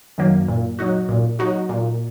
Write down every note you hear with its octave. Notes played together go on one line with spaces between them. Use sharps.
F#2 D#3 F#3 A#3
A#2
F#3 D#4 F#4
A#2
F#3 D#4 F#4
A#2